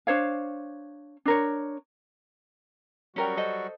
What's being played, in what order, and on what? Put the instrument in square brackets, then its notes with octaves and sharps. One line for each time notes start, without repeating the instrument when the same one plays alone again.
[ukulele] D4 C5 C#5 F5
D4 A#4 C#5
[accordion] F#3 G3 F#4 [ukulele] C#4 A#4 G5
[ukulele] A4 C5 D#5